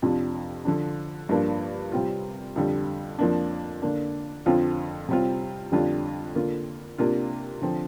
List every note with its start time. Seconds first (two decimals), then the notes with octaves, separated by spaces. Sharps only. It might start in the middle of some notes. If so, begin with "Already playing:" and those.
0.02 F2 C3 F3 D4 F4
0.65 D3 F3 D4
1.29 G2 F3 A#3 D4
1.92 C3 G3 C4 F4
2.56 F2 D3 G3
3.19 F2 F3 A#3 D4
3.82 D3 A#3 D4
4.46 F2 D3 F3 C4 F4
5.09 C3 G3 C4 F4
5.72 F2 D3 G3 D4 F4
6.35 D3 A#3 F4
6.98 C3 A#3 D4 F4
7.62 D3 F3 C4